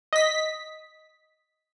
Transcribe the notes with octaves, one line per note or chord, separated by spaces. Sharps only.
D#5 B6